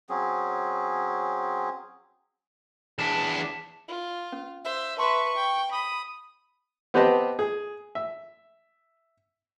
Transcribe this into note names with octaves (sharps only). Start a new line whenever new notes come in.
F#3 C4 C#4 G#4
E2 D4 A5 B6 E7
F4
C#4
C5 E5
B4 E5 A5 C6 C#6
G5
B5 D#6
B3 C4 G4 B4 D#5 A5
G#4
E5